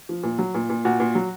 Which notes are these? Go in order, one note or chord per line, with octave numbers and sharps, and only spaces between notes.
F3
A#2
F#3
A#2
A#2
A#2 F#4
A#2
F#3